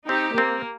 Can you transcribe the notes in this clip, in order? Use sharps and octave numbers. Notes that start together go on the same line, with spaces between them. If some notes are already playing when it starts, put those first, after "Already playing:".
C4 D#4 G4
A#3 C4